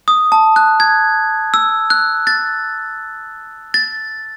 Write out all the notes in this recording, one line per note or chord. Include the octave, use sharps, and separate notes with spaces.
D#6
A5
F#6
G#6
E6
F#6
A6
A6